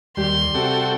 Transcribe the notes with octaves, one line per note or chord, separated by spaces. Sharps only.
D#2 G3 G4 C6
C3 F#4 A4 G5